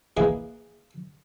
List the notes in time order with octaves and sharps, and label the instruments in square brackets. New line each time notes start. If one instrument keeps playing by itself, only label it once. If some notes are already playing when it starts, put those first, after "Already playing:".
[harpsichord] A#3 E4 G#4 B4 D#5